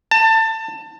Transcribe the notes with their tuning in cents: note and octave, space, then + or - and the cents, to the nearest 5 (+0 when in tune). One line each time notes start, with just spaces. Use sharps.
A5 +25